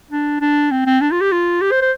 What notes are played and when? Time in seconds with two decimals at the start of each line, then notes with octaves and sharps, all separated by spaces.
0.11 D4
0.41 D4
0.71 C4
0.86 C4
1.01 D4
1.11 F4
1.21 G4
1.32 F4
1.61 G4
1.71 C5
1.81 C5